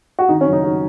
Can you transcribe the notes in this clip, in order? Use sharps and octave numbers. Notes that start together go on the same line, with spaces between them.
F#4
D#3 D#4
C#4
F#1
D#4
F#3